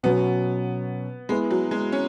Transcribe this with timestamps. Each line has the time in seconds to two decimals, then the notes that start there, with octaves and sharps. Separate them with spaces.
0.03 B2 F#3 B3 C#4
1.29 G#3 B3 E4 G#4 B4
1.51 F#3
1.71 G#3
1.92 C#4